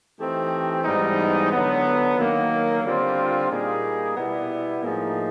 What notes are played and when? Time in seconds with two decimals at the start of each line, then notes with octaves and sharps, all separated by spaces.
0.19 E3 A3 C4 D#4 G4
0.84 G#2 E3 G3 B3 D#4
1.51 D3 F#3 B3
2.18 D#3 F#3 A#3
2.84 D3 G3 C4 F4
3.50 A#2 G3 A#3 D#4 G#4
4.16 B2 G3 B3 E4
4.82 A2 F3 A#3 D#4 G#4